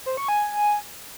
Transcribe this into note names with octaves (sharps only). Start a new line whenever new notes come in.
C5
C#6
G#5